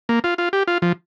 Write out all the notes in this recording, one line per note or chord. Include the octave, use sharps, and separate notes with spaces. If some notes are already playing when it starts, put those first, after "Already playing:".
A#3
F4
F4
G4
F4
F3